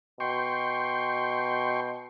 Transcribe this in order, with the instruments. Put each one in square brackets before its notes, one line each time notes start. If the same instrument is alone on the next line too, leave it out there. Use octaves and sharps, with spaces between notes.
[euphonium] B2 [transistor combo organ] G5 C6 C#6